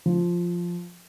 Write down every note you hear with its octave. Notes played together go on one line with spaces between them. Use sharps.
F3